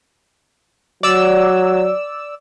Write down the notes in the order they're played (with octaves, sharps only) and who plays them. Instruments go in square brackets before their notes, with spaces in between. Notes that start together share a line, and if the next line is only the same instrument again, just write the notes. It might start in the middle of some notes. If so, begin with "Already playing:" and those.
[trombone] F#3 [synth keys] D5 E6